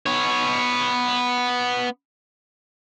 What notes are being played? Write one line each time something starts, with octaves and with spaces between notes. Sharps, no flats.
B3 C#5